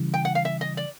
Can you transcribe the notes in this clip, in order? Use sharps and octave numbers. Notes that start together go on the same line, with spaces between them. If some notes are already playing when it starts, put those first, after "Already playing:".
Already playing: C#3 E3 G3
G5
F#5
F5
E5
D#5
D5